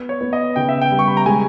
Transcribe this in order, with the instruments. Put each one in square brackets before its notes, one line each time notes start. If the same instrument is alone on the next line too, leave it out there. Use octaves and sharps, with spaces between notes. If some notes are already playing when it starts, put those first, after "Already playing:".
Already playing: [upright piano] B3
[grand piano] C#5
[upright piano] B3
[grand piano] D#5
[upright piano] C#3 [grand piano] G5
[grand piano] E5
G5
[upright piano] G3
[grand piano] C#6
B5
A#5
[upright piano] G#3 [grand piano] G#5